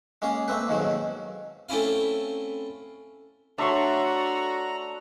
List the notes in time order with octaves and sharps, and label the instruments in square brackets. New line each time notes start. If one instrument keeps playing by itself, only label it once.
[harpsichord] G#3 A#3 C#4 G#4
A3 A#3 C4 B4
F2 G#2 B2 D#3 F#3
A3 C4 C#4 E4 F5
[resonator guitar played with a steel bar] A3 C#5 [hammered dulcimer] D4 E5 C6 [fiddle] F#4 [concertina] A#5